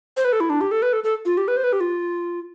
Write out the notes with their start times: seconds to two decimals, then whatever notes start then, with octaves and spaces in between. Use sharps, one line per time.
0.17 C5
0.25 B4
0.32 A4
0.40 E4
0.50 D4
0.61 G4
0.71 A4
0.82 B4
0.93 A4
1.04 A4
1.25 F4
1.37 G4
1.48 B4
1.57 C5
1.64 B4
1.73 G4
1.80 F4